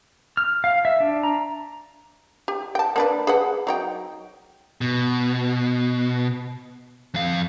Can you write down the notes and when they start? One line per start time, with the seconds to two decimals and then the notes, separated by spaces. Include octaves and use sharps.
0.37 F6
0.64 F5
0.85 E5
1.00 D4
1.23 A#5
2.48 G4
2.75 G5 A5
2.96 A#3 D4 B4
3.27 G#4 B4 F#5
3.67 F#3 D#4 G5
4.81 B2
7.14 F2 F5